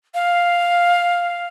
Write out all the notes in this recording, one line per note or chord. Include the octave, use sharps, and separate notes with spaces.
F5